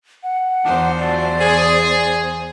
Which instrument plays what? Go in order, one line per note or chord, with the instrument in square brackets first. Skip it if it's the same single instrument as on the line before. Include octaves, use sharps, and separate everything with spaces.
[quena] F#5
[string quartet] E2 C5 [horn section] F3 D4 D#4
[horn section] F3 F#3 A3 [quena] D5
[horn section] G#4